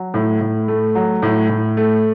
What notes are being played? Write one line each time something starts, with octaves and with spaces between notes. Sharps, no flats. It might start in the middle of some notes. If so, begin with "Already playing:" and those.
Already playing: F#3
A2
A2
A3
F#3
A2
A2
A3